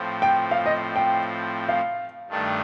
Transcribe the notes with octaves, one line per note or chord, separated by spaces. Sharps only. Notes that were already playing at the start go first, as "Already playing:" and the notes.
Already playing: A2 F3 C4
G5
F5
D#5
G5
F5
G2 D#3 A3 D4